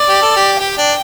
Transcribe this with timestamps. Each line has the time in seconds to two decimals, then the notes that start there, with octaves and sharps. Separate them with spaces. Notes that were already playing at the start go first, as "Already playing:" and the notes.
Already playing: D5
0.09 G4
0.22 A4
0.36 G4
0.60 G4 G5
0.78 D4